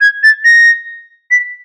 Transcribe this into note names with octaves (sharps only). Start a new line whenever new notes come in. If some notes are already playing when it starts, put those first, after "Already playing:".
G#6
A6
A#6
B6